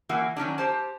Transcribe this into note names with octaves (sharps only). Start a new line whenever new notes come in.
E3 A#3 E4 F#4
D#3 F#3 C#4 D4
G4 C5 A5